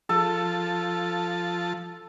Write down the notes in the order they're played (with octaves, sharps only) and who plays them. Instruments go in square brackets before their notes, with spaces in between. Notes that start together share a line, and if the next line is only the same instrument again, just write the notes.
[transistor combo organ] F3 A5 [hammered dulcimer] A4